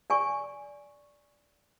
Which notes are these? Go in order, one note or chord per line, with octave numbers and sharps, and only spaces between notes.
D5 G#5 C#6